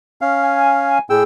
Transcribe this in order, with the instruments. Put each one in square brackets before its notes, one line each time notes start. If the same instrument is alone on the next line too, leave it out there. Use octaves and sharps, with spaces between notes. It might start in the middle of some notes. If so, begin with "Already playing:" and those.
[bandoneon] C#4 F5
[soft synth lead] G#5
[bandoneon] A2 G5 E6 [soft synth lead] G#4